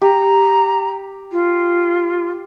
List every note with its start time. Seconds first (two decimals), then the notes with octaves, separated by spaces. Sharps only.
0.02 G4 A#5
1.31 F4